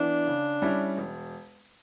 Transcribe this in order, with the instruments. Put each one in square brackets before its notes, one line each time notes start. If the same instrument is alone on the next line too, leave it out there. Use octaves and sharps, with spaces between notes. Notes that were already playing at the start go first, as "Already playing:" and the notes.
Already playing: [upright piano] E3 B3 [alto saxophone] D4
[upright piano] C#3
G3 C#4 E4
E1